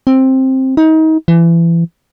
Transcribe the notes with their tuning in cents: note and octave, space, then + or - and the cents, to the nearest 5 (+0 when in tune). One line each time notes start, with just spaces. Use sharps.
C4 +10
D#4 +30
E3 +30